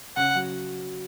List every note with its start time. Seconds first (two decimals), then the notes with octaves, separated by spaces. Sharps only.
0.17 C#3 C#4 F#5
0.35 F#3 F#4